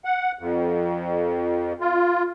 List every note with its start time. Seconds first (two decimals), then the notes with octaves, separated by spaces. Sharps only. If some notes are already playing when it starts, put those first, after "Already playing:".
0.05 F#5
0.39 F2
1.81 F4